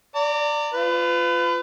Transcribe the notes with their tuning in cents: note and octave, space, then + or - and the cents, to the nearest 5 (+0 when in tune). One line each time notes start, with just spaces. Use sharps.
D5 +0 A#5 -35
F4 +0 B4 +35